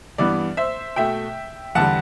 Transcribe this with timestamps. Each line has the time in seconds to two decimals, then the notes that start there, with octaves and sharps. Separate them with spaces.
0.18 G2 E3 B3 D5
0.57 C5 E5
0.96 B2 A3 E5 G5
1.75 E2 D3 G3 F#5 A5